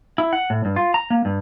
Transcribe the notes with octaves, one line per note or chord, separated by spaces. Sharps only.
E4
F#5
A2
G2
F4
A#5
A#3
G2